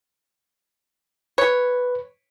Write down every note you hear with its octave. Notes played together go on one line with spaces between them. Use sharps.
B4 C#5